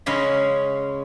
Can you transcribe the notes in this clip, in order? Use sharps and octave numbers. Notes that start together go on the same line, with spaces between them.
C#3 G#3 C#4 F5 B5